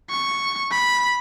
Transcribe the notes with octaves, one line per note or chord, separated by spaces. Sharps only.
C#6
B5